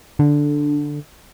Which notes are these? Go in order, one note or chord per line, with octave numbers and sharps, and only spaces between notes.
D3